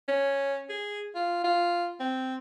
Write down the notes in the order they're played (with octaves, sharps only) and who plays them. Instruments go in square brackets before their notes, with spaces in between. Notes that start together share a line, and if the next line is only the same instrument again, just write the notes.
[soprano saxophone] C#4
G#4
F4
F4
C4